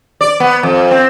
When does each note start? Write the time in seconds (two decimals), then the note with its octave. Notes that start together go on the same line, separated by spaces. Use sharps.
0.21 D5
0.40 B3
0.63 F2
0.91 C4